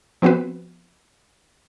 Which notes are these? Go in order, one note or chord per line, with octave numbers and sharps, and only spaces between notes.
F3 B3 C4 F#4 B4